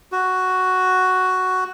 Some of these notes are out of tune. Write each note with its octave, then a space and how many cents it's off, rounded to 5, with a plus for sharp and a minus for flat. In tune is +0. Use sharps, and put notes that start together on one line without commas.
F#4 +5